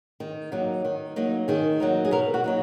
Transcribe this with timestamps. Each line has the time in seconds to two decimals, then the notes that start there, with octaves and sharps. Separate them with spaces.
0.20 D#3
0.52 F#3 A#3 D#4
0.85 D#3
1.16 F#3 A#3 D#4
1.48 D#3 G#4
1.80 F#3 A#3 D#4
2.05 G#4
2.11 B2 A#4
2.34 F#4
2.44 F#3 A#3 D#4